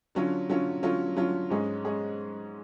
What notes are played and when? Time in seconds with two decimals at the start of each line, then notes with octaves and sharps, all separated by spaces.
0.15 D3 F#3 C#4 F4
0.50 D3 F#3 C#4 F4
0.82 D3 F#3 C#4 F4
1.17 D3 F#3 C#4 F4
1.50 G#2 G#3 C#4 G#4
1.85 G#3 C#4 G#4